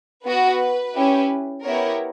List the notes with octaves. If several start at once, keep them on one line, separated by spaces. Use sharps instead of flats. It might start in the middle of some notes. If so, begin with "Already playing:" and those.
B3 F#4 B4
C#4 E4 G4
B3 E4 G4 A#4 C#5